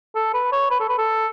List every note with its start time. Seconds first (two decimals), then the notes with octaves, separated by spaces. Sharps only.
0.15 A4
0.34 B4
0.52 C#5
0.70 B4
0.80 A4
0.89 B4
0.98 A4